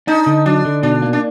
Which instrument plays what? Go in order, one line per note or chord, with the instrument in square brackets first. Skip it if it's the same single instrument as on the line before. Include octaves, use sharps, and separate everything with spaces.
[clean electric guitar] D4 [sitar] D#4
[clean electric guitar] D3
[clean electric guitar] F#3 [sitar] D4
[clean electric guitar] D3
[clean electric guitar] B2 [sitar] D4
[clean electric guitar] A#3
[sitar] D4